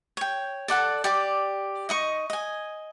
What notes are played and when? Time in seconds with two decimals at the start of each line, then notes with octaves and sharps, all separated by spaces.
0.17 C#5 G5
0.68 A4 D5 F#5 A5
1.04 G4 D5 D6
1.89 D#4 D#5 C#6
2.30 D#5 G#5